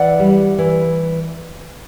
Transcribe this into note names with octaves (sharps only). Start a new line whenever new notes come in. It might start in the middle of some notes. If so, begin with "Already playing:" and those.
Already playing: E3 D5 F#5
G3
E3